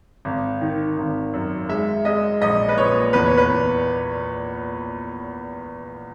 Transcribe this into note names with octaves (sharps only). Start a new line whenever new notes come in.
G#1
D#3
G#1
F#2
G#3 E5
G#3 D#5
A#1 D#5
B4
A#2 C#5
E2 B4
C#5
B4
E2